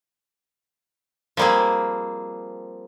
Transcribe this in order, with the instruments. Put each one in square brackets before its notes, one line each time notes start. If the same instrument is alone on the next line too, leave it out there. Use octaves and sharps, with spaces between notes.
[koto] F3 G3 A#3 C4 G#4